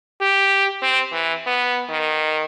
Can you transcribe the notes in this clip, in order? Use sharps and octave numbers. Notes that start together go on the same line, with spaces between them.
G4
C4
E3
B3
D#3